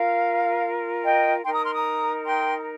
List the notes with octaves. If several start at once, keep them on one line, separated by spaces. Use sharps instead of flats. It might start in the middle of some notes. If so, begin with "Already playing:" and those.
Already playing: F4 A#4 F5
D#5 G5
D#4 A#4 G5 C6
A#5 D#6
C6 F6
A#5 D#6
G5 C6